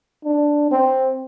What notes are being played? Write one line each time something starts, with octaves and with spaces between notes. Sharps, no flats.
D4
C4